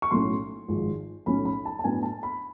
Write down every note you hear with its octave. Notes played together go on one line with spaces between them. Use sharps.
C#6
B1 A2 F#3 A3 C#4 C6
G#1 G#2 F3 G#3
B1 A2 F3 A3 C#4 B5
B5
A5
A5
A2 F#3 B3 D4 G#5
A5
B5